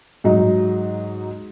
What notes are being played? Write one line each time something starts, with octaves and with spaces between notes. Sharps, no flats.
G#2 F#3 D#4